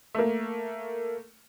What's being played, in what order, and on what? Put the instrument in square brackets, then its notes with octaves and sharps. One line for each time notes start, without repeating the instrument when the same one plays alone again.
[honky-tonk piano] A3 A#3